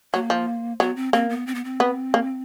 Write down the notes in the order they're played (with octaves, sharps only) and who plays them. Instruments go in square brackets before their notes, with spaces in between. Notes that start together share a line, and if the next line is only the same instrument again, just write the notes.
[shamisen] F#3 [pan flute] A#3
[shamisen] F3
[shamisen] F#3 [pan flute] B3
[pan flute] C4
[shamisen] A#3 [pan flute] C4
[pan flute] B3
C4
B3
C4
[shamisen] B3
A#3